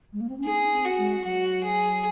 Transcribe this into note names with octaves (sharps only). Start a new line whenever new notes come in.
G#3
A#3
C4
C#4
D#4 G#4
C4
F#4
G#3
F#3 F#4
G#4